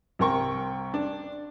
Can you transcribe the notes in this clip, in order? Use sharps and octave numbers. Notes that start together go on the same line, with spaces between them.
C2 C3 A#4 G5 C#6
D4